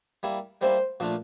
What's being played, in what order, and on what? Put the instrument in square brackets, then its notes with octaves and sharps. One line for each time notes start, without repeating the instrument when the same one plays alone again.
[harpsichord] G3 A#3 E4
[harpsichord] G3 A#3 E4 [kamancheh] C5
[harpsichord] A#2 F3 A3 D4 F4